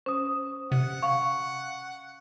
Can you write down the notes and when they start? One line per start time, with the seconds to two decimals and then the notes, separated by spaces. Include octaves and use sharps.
0.06 C#4 C5 D#6
0.72 C3 F#5
1.02 F5 C#6